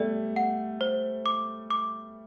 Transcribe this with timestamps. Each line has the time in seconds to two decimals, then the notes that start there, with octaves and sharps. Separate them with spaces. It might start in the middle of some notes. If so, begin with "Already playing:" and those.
Already playing: G3 A3 D5
0.36 F#5
0.81 C5
1.26 D6
1.70 D6